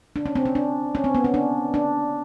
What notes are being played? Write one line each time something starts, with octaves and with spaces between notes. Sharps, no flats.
D4
C#4
C4
C#4
D4
C#4
C4
B3
C#4
D4
D4